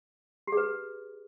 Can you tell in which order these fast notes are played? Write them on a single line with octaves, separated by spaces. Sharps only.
G4 G#4 B4